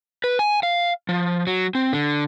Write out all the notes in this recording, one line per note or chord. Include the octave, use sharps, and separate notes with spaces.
B4
G#5
F5
F3
F#3
C4
D3